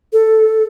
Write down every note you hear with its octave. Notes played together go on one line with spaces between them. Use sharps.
A4